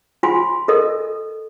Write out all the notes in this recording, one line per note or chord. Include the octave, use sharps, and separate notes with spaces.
F4 G#5 C6
A4 A#4 D#5